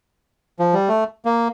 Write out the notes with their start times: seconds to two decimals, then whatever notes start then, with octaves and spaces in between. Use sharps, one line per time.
0.59 F3
0.74 G3
0.89 A3
1.25 A#3